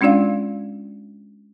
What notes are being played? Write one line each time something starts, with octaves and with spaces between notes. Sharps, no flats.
G#3 C#4 D4 F4 D5 F5